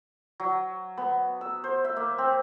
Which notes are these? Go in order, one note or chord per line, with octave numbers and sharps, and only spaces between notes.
F#3
B3
E6
C5
E5
A#3
C4